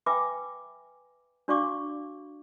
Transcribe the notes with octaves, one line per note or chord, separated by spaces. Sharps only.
B4 E5 G5 G#5 B5 D6
D4 F#4 D5 F5 C#6 D6